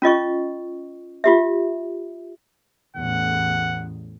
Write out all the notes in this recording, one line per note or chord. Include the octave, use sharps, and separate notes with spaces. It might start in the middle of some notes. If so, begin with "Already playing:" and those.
C#4 F4 D#5 C#6
F4 G4 E5
A1 E2 A2 F#5